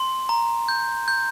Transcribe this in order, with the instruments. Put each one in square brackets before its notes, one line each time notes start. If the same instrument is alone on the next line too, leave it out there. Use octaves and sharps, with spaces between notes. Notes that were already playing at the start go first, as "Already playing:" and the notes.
Already playing: [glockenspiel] C6
A#5
G6
G6